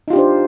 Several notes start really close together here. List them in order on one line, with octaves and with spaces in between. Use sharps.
D#4 F4 G4 D4 C5